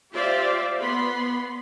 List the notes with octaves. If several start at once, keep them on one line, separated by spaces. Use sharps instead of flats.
F4 G4 C5 D5 E5 F5
B3 B5 C6